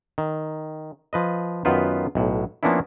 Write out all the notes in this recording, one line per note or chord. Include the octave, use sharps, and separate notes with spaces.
D#3
F3 B4 D#5
F#2 D#3 B3 F4 B4 C5
B1 A2
F3 A#3 B3 C#4 D4 E4